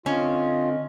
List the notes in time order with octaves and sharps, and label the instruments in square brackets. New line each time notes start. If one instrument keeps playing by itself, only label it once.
[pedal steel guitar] D3 C4 [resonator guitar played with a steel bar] C#4 [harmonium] F4 [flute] D#5